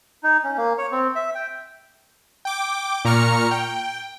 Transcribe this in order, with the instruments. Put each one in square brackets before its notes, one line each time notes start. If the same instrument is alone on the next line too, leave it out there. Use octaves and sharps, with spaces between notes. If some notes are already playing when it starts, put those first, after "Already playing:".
[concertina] D#4
C#4
A#3
C#5
C4
E5
G5
[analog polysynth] G5 D6
A#2 A#5 C#6 F6 C#7
G5